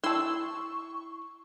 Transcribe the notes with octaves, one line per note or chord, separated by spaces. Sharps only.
E4 A5 C6 C#6 E6